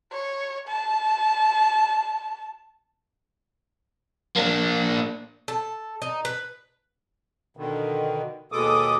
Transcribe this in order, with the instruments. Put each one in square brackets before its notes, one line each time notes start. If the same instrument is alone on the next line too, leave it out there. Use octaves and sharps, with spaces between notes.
[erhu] C#5
A5
[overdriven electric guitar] A#3 D4
[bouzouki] A4
D#4
B4
[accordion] B2 D3 D#3
D#2 B2 G#3 A4 D6 D#6